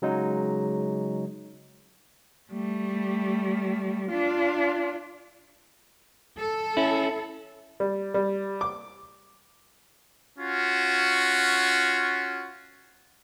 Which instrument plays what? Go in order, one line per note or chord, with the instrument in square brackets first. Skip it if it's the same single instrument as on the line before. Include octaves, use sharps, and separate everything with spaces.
[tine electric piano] C#3 F#3 G#3 D#4
[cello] G3 A3
D4 F4
[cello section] A4
[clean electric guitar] C#4 E4
[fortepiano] G3
G3
D6
[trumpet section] C#4 F4 F#4